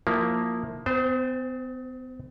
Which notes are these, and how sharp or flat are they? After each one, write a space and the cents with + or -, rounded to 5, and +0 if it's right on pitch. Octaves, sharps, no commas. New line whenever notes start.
F3 +15 A#3 +0 E4 +0
B3 +45 C5 -15 G#5 -45